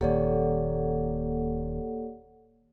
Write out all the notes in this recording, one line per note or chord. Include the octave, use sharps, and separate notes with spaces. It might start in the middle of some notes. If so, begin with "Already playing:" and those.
D#1 D#2 A#3 G4 A4 C#5 D5 F#5